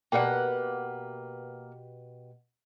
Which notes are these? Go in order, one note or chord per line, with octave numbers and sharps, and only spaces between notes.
B2 A#3 G4 B4 D5 F#5 G5